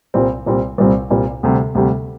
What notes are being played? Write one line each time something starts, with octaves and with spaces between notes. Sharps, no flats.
C2 A#2 G3 C4
C2 A#2 G3 C4
C2 A#2 G3 C4
C2 A#2 G3 C4
D2 C3 G3
D2 C3 G3